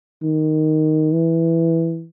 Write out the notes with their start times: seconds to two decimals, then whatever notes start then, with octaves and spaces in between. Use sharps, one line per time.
0.22 D#3
1.12 E3